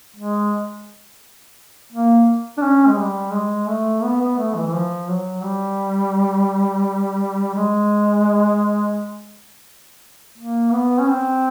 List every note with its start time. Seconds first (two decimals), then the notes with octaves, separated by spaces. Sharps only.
0.16 G#3
1.93 A#3
2.58 D4
2.62 C#4
2.87 G#3
2.98 G3
3.33 G#3
3.68 A3
4.03 B3
4.21 B3
4.38 A3
4.56 E3
4.67 E3
4.74 F3
5.09 F#3
5.44 G3
7.55 G#3
10.38 A#3
10.72 B3
10.99 C#4
11.08 C4